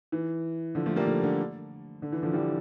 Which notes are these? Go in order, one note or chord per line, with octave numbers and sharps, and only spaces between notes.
E3
D3 F3
F3 A3
G3 A#3
D3 F3
D3
D3
E3
D3 F3
E3 G3